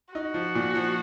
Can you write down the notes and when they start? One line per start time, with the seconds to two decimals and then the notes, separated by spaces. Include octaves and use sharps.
0.14 D#4 F#4
0.34 F3
0.55 A#2
0.75 F3